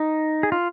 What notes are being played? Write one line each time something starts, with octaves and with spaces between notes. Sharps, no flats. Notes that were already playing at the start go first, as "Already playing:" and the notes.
Already playing: D#4
G#4
F4